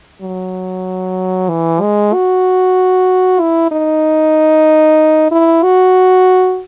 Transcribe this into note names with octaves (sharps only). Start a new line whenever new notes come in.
F#3
E3
G#3
F#4
E4
D#4
E4
F#4